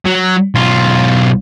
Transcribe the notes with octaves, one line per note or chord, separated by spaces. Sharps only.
F#3
B1 F4